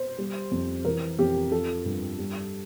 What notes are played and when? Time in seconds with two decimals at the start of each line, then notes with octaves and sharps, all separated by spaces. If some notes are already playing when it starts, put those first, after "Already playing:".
Already playing: C5
0.18 G3
0.51 F2
0.85 E3 A#4
1.19 F2 G4
1.51 F3 A4
1.85 G2
2.19 G3